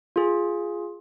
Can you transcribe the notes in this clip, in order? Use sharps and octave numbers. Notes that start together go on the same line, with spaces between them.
F4 G#4